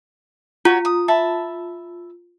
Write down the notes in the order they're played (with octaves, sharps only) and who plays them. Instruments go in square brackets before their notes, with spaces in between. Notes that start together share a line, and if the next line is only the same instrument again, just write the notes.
[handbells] F4 [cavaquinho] F#4 C#5
[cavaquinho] D#6
E5 A5 B5